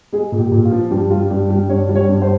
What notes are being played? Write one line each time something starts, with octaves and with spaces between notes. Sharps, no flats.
G#3 G#4
A#2
G4
A#2
F4
F3
G2 G4
G3 F4
G2 G4
G3 G4
G2 C#5
G3
C#5
G2
C5